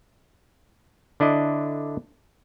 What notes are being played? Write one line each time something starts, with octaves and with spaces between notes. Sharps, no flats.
D3 D4 E4 D#5